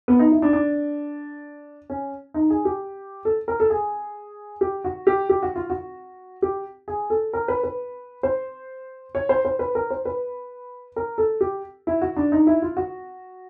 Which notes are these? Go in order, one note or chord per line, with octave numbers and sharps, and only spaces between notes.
B3
D#4
E4
D4
D4
C#4
D#4
G#4
G4
A4
A#4
A4
G#4
G4
F#4
G4
G4
F#4
F4
F#4
G4
G#4
A4
A#4
B4
B4
C5
C#5
C5
C5
B4
A#4
C5
B4
A#4
A4
G4
E4
F#4
D4
D#4
E4
F4
F#4